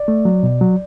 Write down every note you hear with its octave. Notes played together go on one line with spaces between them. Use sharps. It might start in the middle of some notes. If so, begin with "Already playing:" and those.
Already playing: D5
A3
F#3
B2
F#3